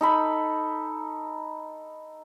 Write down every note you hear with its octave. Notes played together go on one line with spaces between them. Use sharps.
D#4 A4 B5